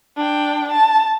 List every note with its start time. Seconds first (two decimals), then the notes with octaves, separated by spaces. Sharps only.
0.17 D4 G5
0.68 A5